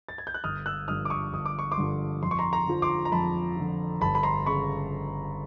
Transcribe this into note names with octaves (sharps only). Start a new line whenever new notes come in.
A6
G#6
G6
F#6
G1 D#6 F6
E6 F#6
G2 D3 F3 D#6 F6
D6
C#6 D#6
G1 D#6
D6
C#6
C6 D6
G2 D3 F3
F2 C6
C#6
A#5 C6
A#5 C6
D3 F3
C6 D6
A#5
F2 A5 B5
D3 F3
G1 A5 B5
B5
A#5 C6
C#3 B5 C#6